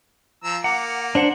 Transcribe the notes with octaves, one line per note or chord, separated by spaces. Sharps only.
F3 A#5 E6
A#3 F#5 A#5 D6
D4 C5 F#5